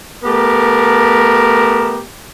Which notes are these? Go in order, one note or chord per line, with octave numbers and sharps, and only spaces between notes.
A3 B3 G4 A#4